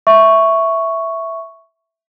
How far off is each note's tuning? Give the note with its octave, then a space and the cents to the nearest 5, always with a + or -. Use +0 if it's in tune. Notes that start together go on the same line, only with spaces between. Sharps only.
E5 +0 C#6 +0